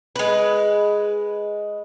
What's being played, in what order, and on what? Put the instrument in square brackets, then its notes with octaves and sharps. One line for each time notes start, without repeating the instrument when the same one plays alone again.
[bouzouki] G#3 B4